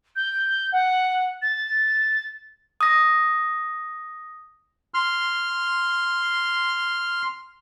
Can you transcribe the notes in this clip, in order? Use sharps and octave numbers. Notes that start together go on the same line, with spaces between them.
G6
F#5
A6
D#6 A#6
C6 F6